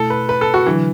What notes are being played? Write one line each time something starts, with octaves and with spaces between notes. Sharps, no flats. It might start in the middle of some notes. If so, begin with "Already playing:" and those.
Already playing: B2 A3 E4 A4
B4
B4
A4
F#4
D3 E3 F#3 D4